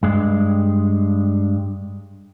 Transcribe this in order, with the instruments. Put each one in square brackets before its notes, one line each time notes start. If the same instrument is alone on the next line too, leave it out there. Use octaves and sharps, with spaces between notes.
[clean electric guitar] G2 G#3